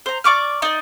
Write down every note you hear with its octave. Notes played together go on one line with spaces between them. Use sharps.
C5 A#5
D5 C#6 D6 F6
D#4 D5